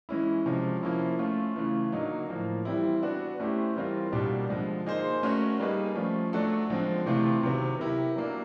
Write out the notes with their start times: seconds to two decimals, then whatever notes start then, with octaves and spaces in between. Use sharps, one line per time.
0.09 E3 G#3 C#4 E4
0.46 C3 F3 G#3 C#4
0.83 F3 A#3 C#4 E4
1.19 A3 C#4 F4
1.56 C#3 E3 A3
1.92 D3 F#3 A#3 D#4
2.29 A2 F3 A#3
2.65 E3 G3 C4 E4
3.02 B3 D4 F#4
3.40 A3 C#4 E4 G4 C5
3.76 E3 G3 C4 F4 A#4
4.12 B2 G3 A#3 D4 G4
4.49 D3 F3 G#3
4.86 A#3 D#4 G#4 C5
5.23 A3 C#4 F#4 A#4 C#5
5.60 G3 A#3 D#4 G#4 B4
5.95 F3 A3 C#4
6.33 F#3 A3 D4 F#4 A4
6.70 D3 F3 G#3 C4
7.06 C3 E3 A3 C4 F4
7.43 C3 D#3 F#3 B3
7.79 B3 E4 G4 A#4
8.16 F#3 A#3 D4